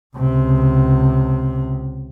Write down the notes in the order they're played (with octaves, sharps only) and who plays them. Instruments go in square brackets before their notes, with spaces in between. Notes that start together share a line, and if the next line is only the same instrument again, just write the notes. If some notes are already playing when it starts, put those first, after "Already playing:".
[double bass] C#2 C3